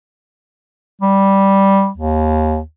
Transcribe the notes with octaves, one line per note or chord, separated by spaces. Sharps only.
G3
D#2